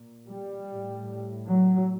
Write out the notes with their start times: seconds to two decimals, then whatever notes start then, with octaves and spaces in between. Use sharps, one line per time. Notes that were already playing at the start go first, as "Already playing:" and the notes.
Already playing: A#2
0.29 G3
0.70 A2
1.49 F#3